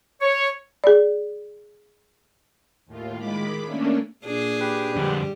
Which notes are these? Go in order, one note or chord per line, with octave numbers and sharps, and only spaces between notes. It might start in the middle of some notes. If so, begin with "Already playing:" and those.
C#5
G#4 D5
D#2 A2 F4
D#3 G#3 B5 D6 B6
A3 A#3 C#4 D4
A#2 D4 G#4
G4 B4
F2 D3 G3